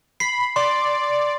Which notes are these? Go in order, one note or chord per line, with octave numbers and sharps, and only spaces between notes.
B5 C7
D5 C6